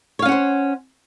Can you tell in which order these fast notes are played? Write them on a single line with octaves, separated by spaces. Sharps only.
C#5 F5 C#4 F#5 C5